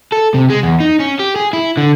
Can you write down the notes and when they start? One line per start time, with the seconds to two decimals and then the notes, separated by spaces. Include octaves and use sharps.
0.12 A4
0.34 C3
0.50 G#3
0.63 E2
0.80 D#4
1.00 C#4
1.19 G4
1.36 G#4
1.53 E4
1.77 D3